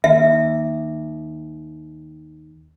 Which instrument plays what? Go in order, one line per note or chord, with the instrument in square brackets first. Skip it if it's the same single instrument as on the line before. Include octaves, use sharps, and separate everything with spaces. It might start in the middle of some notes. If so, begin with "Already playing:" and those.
[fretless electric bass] D#2 [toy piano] E5